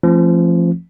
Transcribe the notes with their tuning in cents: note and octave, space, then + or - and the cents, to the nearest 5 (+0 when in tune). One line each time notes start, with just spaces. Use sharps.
F3 -25 A3 +0 C4 +45